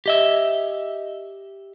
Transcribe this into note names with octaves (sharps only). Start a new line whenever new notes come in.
G4 D#5 E5